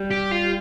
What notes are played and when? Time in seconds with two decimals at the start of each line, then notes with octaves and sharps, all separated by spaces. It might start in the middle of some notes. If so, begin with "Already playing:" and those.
Already playing: G3
0.11 G4
0.32 F4